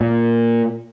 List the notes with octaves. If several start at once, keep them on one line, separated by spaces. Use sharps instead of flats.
A#2